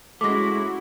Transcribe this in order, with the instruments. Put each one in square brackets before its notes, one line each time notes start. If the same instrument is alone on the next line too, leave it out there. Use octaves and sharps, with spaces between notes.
[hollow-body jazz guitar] G#3 A3 [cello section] C#4 E4 F#4 [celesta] D6 A#6